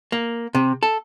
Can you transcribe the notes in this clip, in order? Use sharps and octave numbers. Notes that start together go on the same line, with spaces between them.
A#3
C3
A4